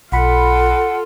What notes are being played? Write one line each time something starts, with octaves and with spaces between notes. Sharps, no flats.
B1 F4 A4 F#5 B5